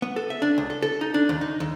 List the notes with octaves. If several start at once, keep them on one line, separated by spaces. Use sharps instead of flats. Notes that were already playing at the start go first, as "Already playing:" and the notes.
B3
A4
E5
D4
C#2
A4
A4
D#4
D4
D#2
D#4
D#2